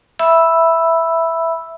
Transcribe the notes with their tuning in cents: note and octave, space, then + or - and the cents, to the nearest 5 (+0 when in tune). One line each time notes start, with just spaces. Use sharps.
E5 +0 B5 -5 E6 +0